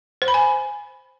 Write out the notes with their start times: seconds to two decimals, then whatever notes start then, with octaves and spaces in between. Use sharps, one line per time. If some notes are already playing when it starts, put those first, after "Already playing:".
0.22 C5
0.28 B5
0.34 G#5